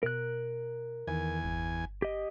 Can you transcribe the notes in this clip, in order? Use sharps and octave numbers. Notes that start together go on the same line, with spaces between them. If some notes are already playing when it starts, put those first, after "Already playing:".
B2 A#4 F#6
E2 D#3 G#5
G1
G4 D#5